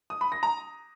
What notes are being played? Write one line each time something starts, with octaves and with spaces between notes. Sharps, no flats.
D#6
B5
A#6
A#5